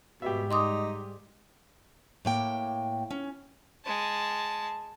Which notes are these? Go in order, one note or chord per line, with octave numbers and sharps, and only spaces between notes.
G#2 B2 G3 G#3 G4 E5
D#4 C6 D6 D#6
A2 A#3 G5
C#4
G#3 A5